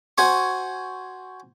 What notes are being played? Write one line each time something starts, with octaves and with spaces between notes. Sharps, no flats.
F#4 C5 G#5 C#6